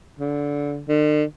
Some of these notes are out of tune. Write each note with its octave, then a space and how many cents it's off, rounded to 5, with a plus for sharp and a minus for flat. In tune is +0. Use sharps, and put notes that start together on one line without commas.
D3 -20
D3 +45